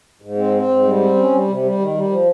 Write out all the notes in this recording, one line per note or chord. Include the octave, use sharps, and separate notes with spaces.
G#2
C4
C4
G#2
G3
C4
C#4
G3
C3
G3
D#3
G3
F3